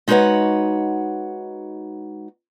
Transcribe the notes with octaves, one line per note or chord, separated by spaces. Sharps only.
G#3 D#4 F#4 B4 C#5 F#5